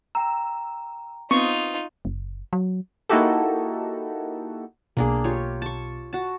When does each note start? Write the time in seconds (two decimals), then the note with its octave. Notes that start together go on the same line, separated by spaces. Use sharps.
0.15 G5 A#5 E6
1.31 B3 C4 D#4 F4 C#6 D#6
2.05 F#1
2.53 F#3
3.09 A#3 D#4 E4 F#4 G4 A4
4.97 B1 B2 A#3 D4 G#4
5.24 F4 G4 C#5
5.62 A5 C#6
6.13 F#4 A5